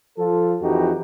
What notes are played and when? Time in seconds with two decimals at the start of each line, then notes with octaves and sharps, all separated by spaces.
0.18 F3 F4 A4
0.62 F2 E3 D#4 F#4 G4